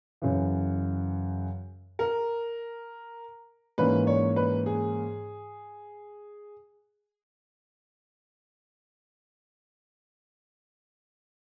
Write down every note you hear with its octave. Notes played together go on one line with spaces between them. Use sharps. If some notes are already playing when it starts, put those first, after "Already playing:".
F#2 C#3 E3
A#4
G#2 E3 A#3 C#4 B4
C#5
B4
G#4